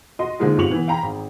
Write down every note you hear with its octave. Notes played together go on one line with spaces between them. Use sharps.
F#4 D#5 C6
D3 F3 G#3 A#3 D#4 F4
G1 C3 F4 C#6 F7 F#7
E3 B3
F5 G5 A#5 B5
G#1